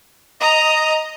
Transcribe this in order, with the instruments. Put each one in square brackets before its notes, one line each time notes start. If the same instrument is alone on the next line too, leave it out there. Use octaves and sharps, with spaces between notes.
[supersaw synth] D#5 [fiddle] A#5 D#6